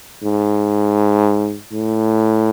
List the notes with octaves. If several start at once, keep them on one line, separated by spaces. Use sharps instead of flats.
G#2
A2